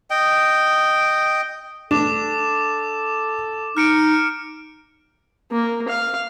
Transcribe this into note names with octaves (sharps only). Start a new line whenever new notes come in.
D#5 G5
D4 A4 D6 E7
D#4 F6 C#7 D7
A#3
F5